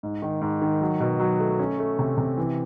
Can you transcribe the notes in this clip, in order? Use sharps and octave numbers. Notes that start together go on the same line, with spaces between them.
G#2
D#3
G#2
D#3
F#3
B2
F#3
A3
C#4
A3
C3
C3
E3